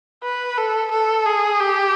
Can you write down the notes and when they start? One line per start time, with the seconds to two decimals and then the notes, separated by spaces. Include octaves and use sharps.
0.24 B4
0.58 A4
0.91 A4
1.26 G#4
1.60 G4